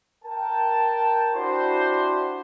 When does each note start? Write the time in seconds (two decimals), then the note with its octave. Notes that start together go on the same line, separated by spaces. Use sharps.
0.25 A#4 G5 A5
1.34 D4 E4 F#4 G4 C5